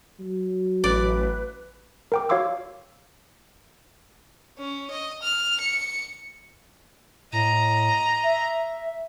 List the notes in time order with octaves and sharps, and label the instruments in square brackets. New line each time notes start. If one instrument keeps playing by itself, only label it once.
[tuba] F#3
[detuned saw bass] A1 [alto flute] B4 [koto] D5
[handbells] A#4 G5 D6
F#4 C#5 F5 C6 D6 E6
[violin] C#4
D#5
F6
C#7
[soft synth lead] A2 [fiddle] D#5 A#5
[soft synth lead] E5